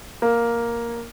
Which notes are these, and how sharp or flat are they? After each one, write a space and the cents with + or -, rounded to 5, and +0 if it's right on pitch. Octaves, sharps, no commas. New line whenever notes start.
A#3 +5